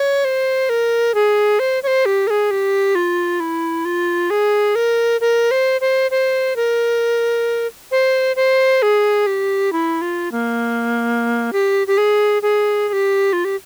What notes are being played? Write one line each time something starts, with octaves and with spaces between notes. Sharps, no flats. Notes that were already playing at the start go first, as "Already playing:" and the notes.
Already playing: C#5
C5
A#4
G#4
C5
C#5
C5
G4
A#4
G#4
G4
F4
E4
F4
G#4
A#4
A#4
C5
C5
C5
A#4
C5
C5
G#4
G4
E4
F4
A#3
G4
G4
G#4
G#4
G#4
G4
F4
G4